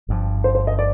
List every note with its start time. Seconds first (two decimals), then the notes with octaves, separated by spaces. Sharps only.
0.08 G1 G2 F3
0.44 C5
0.55 C5
0.67 D#5
0.79 D5